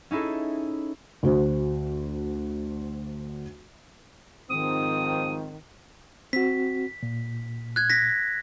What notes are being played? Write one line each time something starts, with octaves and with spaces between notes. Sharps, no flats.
C#4 D#4 E4 G#4 A4
D2 F#4 C5
G#2 D#3 F3 C4 D#6
C4 F#4 B6
A#2
F#6 G#6
A#6 B6